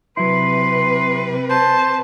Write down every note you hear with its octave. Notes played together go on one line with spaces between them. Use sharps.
C3 F#3 E4 B4 C6
C5 A5